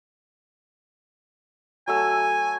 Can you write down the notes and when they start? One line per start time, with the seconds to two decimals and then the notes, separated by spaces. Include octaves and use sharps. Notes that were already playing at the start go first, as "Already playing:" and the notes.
1.88 F#3 A3 G#5 E6